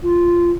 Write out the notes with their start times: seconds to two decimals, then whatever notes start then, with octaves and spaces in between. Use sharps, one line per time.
0.03 F4